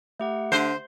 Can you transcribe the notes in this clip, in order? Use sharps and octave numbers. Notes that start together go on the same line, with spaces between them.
A3 G4 E5 F#5
D3 C5